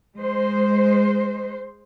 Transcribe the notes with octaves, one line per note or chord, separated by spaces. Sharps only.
G#3 C5